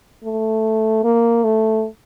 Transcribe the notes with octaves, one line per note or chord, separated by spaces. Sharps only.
A3
A#3
A3